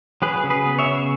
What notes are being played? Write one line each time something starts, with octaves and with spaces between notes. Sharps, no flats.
F#3 G#4 B4
C#3
G#4 B4
B3
C#5 E5
C#3